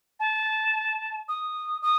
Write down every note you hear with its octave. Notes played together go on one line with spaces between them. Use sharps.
A5
D#6
D#6